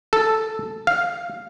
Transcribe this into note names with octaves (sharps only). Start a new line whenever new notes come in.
A4
F5